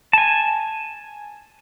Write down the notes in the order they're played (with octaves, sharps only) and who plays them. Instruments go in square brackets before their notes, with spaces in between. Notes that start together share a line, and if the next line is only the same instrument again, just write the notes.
[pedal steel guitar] G#5 A5